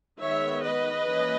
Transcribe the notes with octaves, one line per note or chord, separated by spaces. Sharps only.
D#3 G#3 B3 C#5 E5
B4 D#5
E3 A#3 C#4